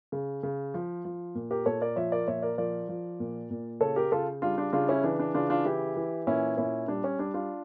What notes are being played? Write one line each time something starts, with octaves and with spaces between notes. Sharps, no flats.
C#3
C#3
F3
F3
A#2
G4 A#4
A#2 A4 C#5
A#4 D5
F3 C#5 E5
A#4 D5
A#2 C#5 E5
A#4 D5
F3 A#4 D5
F3
A#2
A#2
C#3 A4 C#5
G4 A#4
C#3 F4 A4
G3 D4 F4
D4 F4
C#3 D4 F4
C#4 E4
E3 D4
D4
C#3 D4 F4
D4 F4
E3 E4 G4
E3
A#2 C#4 E4
A#2 C#4 E4
G3 D4
C#4
G3 D4
D4 F4